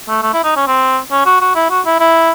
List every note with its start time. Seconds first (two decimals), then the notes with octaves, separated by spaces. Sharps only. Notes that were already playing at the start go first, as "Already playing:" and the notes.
0.08 A3
0.22 A3
0.33 E4
0.44 D#4
0.56 C#4
0.67 C4
1.11 C#4
1.26 F#4
1.41 F#4
1.55 E4
1.70 F#4
1.86 E4
2.00 E4